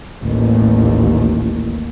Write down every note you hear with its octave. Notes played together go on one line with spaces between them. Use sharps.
A1 D#2